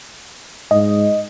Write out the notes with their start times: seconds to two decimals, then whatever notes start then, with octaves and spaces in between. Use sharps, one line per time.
0.71 G#2 D#5